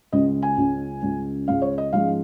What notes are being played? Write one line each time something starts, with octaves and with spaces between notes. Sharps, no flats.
C#2 C#3 G#3 C#4 D#5
G#5
C#2 C#3 G#3 C#4
C#2 C#3 G#3 C#4
C#2 C#3 G#3 C#4 F5
C#5
D#5
G#2 F3 G#3 C#4 F5